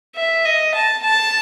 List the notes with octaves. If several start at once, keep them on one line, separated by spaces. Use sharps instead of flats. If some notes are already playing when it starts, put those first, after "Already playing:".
E5
D#5
A5
A5